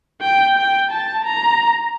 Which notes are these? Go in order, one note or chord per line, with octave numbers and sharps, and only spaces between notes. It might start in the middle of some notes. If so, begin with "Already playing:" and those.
G5
G5
A5
A#5